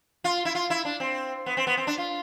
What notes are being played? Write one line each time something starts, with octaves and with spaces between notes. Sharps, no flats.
F4
E4
F4
E4
D4
C4
B3
C4
B3
C4
D4
F4